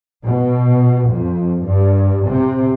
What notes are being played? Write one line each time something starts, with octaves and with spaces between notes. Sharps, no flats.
B2
F2
G2
C3